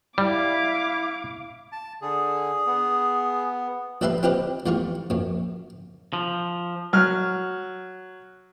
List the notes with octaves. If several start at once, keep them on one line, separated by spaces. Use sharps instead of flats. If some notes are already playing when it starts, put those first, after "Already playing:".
G3 E4 F5 D6
A5
D3 G#4
B3
A#1 G3 A4 B4 E5 C6
C4 F4 G4 B4 D#5
E2 G3 A3 F4 C#6
A#1 F#2
F3
F#3 F6